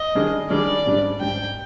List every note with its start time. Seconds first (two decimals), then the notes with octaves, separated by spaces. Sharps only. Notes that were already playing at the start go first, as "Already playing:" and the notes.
Already playing: D#5
0.15 D#3 G3 D4 G#4
0.50 D#3 G3 D4 G#4 D5
0.86 G#2 G3 D4
1.21 G#2 G3 D4 G5